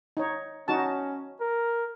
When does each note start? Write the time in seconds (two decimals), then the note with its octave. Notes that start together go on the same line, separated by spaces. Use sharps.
0.17 D#4 C#5
0.68 C#4 D#4 F#4 A5
1.40 A#4